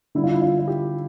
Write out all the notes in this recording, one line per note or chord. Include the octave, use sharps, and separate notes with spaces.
D3 G3 E4
F4
E4
F4
F4
G4